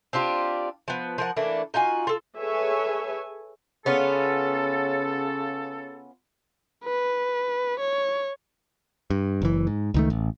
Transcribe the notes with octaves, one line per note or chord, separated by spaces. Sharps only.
C4 D4 F4 G4
F3 B3
F3 A#4 F#5
E3 A3 A#3 D4
D#4 F4 F#4 G#5
F4 A4
G#4 A4 B4 C#5 E5 G#5
C#3 B3 C#4 F4 A4
B4
C#5
G2
F#1 E3
G#2
C#2 D#3 A3
A1